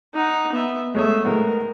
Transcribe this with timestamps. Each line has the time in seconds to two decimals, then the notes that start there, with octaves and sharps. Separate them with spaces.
0.14 D#4 F#5
0.52 B3 E5
0.95 G#3 A3 C#5 E5 D#6
1.25 A2 G#3 B3 A#4